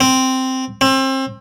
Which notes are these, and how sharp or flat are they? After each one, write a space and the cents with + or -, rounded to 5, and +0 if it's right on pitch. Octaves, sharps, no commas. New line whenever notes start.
C4 -5
C4 +30